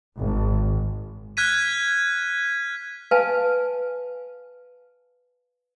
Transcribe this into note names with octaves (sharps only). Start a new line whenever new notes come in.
G#1
F6 F#6 G#6 B6 D#7
B4 F5 G#5 A5